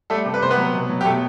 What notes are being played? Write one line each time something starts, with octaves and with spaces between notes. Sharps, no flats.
G3 A3 A4
C3
B4
C3 C5
B3 B4
F#3
B2
F#3
G4
B2 A3 A4